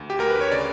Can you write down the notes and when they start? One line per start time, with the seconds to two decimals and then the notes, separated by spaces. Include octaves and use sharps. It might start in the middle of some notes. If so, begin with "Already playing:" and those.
Already playing: D2
0.10 G4
0.19 D2 A#4
0.30 B4
0.41 C#5
0.52 C#3 D5